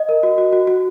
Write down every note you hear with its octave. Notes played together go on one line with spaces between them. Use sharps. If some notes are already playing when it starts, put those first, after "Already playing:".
Already playing: D#5
A#4
F#4
F#4
F#4
F#4